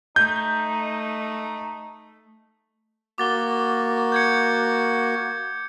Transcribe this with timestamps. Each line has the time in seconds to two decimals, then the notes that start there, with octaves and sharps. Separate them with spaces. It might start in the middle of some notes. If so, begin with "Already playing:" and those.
0.16 A3 D#4 G6
3.18 A#3 F#4 D6 A6 G7
4.12 G6 G#6 C#7